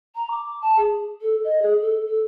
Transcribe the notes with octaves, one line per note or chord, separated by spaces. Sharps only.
A#5
D6
A5
G#4
A4
D#5
G#4
A4
A4